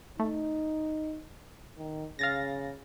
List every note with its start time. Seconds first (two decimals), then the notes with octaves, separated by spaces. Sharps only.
0.19 A3 D#4
1.78 D#3
2.19 C#3 F5 A6 A#6